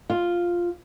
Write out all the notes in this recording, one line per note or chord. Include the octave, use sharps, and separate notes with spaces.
F4